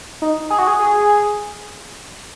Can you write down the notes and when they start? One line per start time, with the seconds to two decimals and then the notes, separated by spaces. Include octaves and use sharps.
0.22 D#4
0.50 G#4
0.58 F#4
0.67 G#4
0.79 G#4